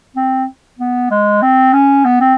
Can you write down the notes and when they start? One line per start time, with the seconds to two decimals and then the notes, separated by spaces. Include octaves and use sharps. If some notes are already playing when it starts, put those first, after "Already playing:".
0.16 C4
0.79 B3
1.11 G#3
1.42 C4
1.73 C#4
2.05 B3
2.21 C4